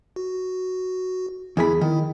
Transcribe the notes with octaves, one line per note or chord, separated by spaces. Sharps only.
F#4
E2 E4 G#4 B5
D#3 E4